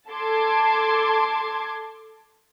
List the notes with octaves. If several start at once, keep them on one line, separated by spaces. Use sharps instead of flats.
A4 A5 C6 D6 G#6